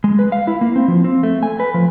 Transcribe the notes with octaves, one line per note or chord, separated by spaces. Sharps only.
G#3
B4
F5
E4
A#3
C4
F3
C4
A3
G#5
B4
F3